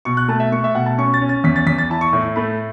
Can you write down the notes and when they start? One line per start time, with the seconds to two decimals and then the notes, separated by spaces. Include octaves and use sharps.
0.05 B2 C#6
0.17 F#6
0.28 A3 A5
0.40 E5
0.52 A3 C#6
0.64 E5
0.75 B2 F#5
0.86 A5
0.98 C#4 C#6
1.14 A6
1.21 C#4
1.29 A6
1.44 E2 B6
1.56 A6
1.67 E2 B6
1.78 A6
1.90 E4 A5
2.01 C#6
2.13 A2
2.36 A3 B5